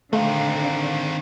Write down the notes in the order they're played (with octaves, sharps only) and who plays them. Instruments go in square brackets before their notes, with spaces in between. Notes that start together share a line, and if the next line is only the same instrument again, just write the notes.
[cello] D3 [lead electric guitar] D#3 C4 [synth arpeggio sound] A3 [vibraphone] F5